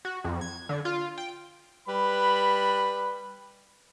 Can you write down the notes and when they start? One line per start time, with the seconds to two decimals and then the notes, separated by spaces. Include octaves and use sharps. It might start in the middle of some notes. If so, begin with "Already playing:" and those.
0.05 F#4
0.24 F2
0.41 G#6
0.69 D3
0.85 F4
1.18 G5
1.88 G3 B4 B5